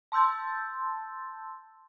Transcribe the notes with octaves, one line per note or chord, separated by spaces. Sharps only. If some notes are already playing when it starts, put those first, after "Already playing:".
A5 C6 E6 G6 A6